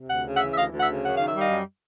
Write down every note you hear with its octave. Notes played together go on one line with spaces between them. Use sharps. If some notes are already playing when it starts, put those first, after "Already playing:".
Already playing: C3
D2 F#5
C#3
E5 F#5
E3
E5
D2 D#5 F5
D2
E5 F#5
C#3
F#2 F#5
D#3 F5
E5
G3
D#5 F5
F#2